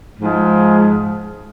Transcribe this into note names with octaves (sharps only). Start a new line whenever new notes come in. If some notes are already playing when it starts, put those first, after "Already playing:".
G#2 F3 G#3